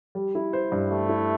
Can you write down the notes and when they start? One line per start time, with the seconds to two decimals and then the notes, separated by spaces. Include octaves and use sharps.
0.15 G3
0.35 E4
0.53 C5
0.72 G2
0.90 G3 A3
1.09 E4